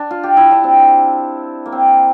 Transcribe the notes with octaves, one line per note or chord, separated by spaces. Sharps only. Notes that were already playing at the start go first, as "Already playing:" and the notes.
Already playing: D4
F4
G4
E4
D4
C4
A#3
C4